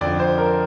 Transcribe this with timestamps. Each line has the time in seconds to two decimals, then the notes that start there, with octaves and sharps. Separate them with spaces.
0.01 F2 D3 F3 D5
0.20 C5
0.38 A#4